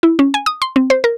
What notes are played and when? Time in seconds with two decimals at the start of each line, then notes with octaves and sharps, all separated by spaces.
0.03 E4
0.19 C#4
0.34 G#5
0.46 D#6
0.62 C6
0.76 C4
0.90 C5
1.04 A#4